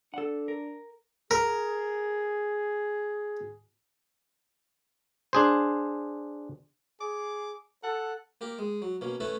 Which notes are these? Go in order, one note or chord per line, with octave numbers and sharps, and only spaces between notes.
D4 A4 F#5
A#4
G#4 A#4
D4 G#4 C5
G#4 D6
A4 F#5
A#3 G4 A#4
G#3
F#3
B2 A#3 C#4
A3 C#4 E4 A4 B4